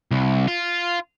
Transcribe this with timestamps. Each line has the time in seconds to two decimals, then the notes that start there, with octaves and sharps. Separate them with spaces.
0.11 C2
0.47 F4